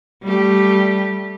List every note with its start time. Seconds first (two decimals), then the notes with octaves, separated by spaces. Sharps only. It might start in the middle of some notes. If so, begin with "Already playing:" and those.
0.23 G3 A3 G4